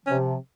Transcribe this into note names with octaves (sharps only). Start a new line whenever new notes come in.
C3 F3 C#4